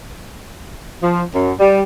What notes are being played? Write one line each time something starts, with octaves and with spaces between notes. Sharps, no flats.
F3
F#2
G3